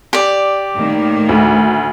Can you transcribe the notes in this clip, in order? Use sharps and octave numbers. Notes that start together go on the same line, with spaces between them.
G4 D5
A2 D#3 A#3
D2